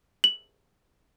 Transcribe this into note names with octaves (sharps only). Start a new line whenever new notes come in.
F#7